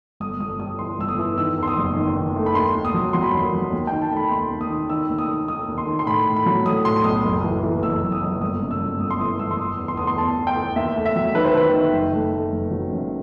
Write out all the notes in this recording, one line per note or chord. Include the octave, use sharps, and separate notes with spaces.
G1 D#6
G1 D#6
G3 D#6
E3 C6
G1 E6
D#6
E3
D#3 E6
E2
C6
D#6
F#1
D#3
D#3
A3
B5
D#2 C6
D#2
D#6
F#3
F#3 C6
B5
D#2 C6
F#3
D#2
G5
D#3
A5
A3 B5
D#2 C6
D#2
D#6
D#3
D#3 E6
D#2
D#6
D#3
D#3 D#6
D#2
C6
D#3
C6
A2 B5
A2
B5
F#3
A2 D#6
A2 C6
B1 D#6
F#1
E3
E3
F#1 E6
F#1
D#6
F#1
G1 D#6
F#2
E6
G1
G1 D#6
C6
E3 D#6
G1 E6
C6
E3 D#6
E2
C6
E2 D#6
C6
E2 A5
E2
G5
E2
D#2 E5
A3
E5
F#3
D#3 B4
C5
D#3 B4
D#3
F#1
A3
A3
F#1
F#3
F#2